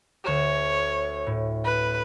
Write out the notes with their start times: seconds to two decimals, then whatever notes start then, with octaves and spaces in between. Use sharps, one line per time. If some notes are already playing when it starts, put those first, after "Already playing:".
0.25 D2 C#5 E7
1.27 A2
1.65 B4